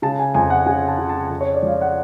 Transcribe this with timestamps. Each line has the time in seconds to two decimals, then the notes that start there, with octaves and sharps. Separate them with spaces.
0.02 C#3 A5
0.19 G#5
0.35 F2 G#5
0.50 F#5
0.66 C#3 G#5
0.88 A5
0.99 C#3
1.09 A5
1.30 F2
1.41 C#5
1.54 D5
1.63 F3 F5
1.81 F#5